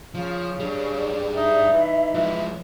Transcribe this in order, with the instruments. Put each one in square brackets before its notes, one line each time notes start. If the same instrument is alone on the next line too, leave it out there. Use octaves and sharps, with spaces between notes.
[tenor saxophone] C#3 [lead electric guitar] F3
[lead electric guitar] G3 D4 [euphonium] G#4
[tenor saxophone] D#4 [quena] E5
[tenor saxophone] E3 [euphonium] D#4
[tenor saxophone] E3 [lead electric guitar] F3 G#3